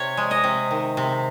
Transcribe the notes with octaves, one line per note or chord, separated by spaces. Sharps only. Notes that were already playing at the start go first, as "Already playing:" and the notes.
Already playing: C3 C#5
G#3
D#5
C3
D#3
C3